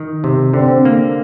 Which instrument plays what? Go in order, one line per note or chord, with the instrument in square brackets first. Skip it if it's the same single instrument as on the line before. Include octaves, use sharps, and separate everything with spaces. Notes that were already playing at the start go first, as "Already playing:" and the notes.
Already playing: [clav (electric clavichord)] D#3
C3
[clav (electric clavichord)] D3 [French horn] C4
[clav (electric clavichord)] A#3